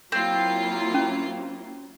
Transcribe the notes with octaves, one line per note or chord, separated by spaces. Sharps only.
F#3 A#3 C4 E4 F4 C7
C#4